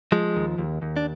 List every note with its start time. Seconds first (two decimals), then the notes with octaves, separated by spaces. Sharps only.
0.12 F3 G#3
0.36 D#2
0.58 D#2
0.82 D#2
0.96 D4